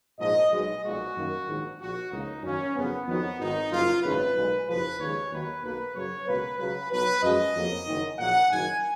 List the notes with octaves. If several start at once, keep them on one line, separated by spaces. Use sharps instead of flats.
A#1 G#2 F3 D#5
B1 B2 G#3 D#5
B1 A#2 F3 G#3 F#4
F#2 D#3 A#3
A#1 G#2 D#3
A#1 A#2 F3 F#4
C#2 C#3 F3 A#3 D#4
F#2 D#3 F#3 A#3 C#4
F#1 F2 C#3 F#3 A#3 B3
F2 D#3 F#3 B3
G#1 G#2 D#3 D#4
F#1 F#2 F3 A#3 F4
G#1 F#2 C#3 B4
B1 A#2 G#3
F#1 F2 F3 B4
D#2 C#3 F3 G#3 C#5
D#2 D#3 F#3 A#3 B4
B1 B2 A#3 B4
F#2 C#3 F#3 C#5
C#2 B2 F#3 A#3 B4
C#2 C#3 F#3 B4
B1 B2 F#3 B4
F#2 F3 G#3 D#5
F2 C#3 F#3 A#3
F#1 F#2 D#3
A#1 A#2 F#3 A#3 F#5
F#1 F#2 D#3 G#5